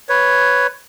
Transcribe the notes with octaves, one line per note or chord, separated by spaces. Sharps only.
B4 C#5